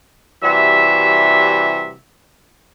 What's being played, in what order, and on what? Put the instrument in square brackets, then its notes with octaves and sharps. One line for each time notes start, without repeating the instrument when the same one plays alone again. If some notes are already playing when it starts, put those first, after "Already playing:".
[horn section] C3 E3 G3 F#4 E5